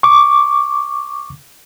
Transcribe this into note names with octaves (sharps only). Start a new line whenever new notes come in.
C#6 D6